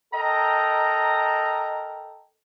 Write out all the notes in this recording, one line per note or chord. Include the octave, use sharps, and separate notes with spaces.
A4 A#4 D#5 G5 A#5